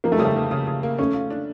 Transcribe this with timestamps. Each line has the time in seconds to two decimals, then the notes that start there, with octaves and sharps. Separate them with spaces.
0.04 F3 A#3
0.12 A3
0.18 C#3 G3
0.25 A3
0.36 A#3
0.51 C#3
0.67 C#3
0.83 A#3
0.98 A3 C#4
1.14 F4
1.30 D4